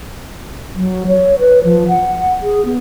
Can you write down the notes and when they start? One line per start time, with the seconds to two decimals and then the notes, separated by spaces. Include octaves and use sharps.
0.76 F#3
1.08 C#5
1.39 B4
1.64 F3
1.88 F#5
2.42 G#4
2.65 B3